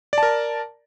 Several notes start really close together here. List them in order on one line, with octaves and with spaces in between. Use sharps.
D5 A5 A#4